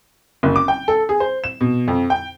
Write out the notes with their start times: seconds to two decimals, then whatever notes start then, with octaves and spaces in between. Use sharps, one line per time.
0.43 F#1
0.56 D6
0.68 G5
0.88 A4
1.09 G#4
1.20 C5
1.44 E7
1.61 B2
1.88 F2
2.10 G5